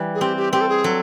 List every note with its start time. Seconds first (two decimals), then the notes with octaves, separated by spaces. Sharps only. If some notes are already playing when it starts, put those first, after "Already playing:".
Already playing: E3 G3
0.14 G#4
0.21 C4 G4
0.37 G4
0.53 C4 G4
0.61 A4
0.69 G#4
0.84 F#3 A4